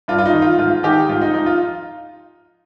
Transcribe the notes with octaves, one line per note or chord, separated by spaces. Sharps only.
G2 F4
F4
D#4
D#3
F4
G#2 F4
D#3 D#4 G4
G#2 F4
D#4
F3 D#4
F4